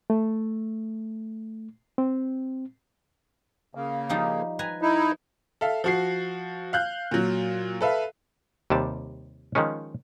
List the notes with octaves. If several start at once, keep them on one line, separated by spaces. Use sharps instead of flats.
A3
C4
C#3 A#3
F3 G3 D#4
B4 G#5 A#5
D#4 E4
A4 E5 F5
F3 F#4 C7
F5 F#6 G6
A#2 F#3
A4 B4 E5 F5
D#2 C3 G3 A5
D#3 F3 G#3 C#4